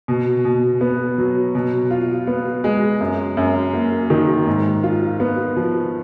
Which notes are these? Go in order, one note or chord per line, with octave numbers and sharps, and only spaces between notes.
B2
B2
B3
F#3
B2
F4
B3
G#3
F#2
F#2
A#3
D#3
G#2
F4
B3
F3